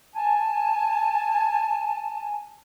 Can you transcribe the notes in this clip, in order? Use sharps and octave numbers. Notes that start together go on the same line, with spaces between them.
G#5 A5